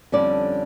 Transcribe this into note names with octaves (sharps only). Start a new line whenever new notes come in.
F2 D3 G3 C#4 D5